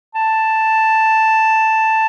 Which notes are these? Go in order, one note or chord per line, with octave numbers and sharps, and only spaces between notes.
A5